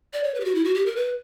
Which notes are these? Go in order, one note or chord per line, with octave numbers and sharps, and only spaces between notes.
D5
C#5
B4
G4
F#4
E4
F#4
G4
A#4
B4